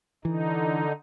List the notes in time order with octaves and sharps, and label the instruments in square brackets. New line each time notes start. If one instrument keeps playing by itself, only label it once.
[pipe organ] D3 D#4 [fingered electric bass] E3